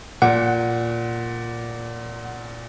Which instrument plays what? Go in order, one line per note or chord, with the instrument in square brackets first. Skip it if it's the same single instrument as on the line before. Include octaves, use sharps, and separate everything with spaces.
[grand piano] A#2 [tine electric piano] F#5